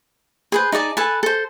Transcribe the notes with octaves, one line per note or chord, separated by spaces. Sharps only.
G#4 B4 C5
D#4 G#4 D5 A5
A4 B4 G#5 A5
A4 C5